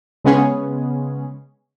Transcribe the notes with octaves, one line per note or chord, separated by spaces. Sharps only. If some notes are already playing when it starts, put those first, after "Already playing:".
C#3 G#3 B3 C#4 G#4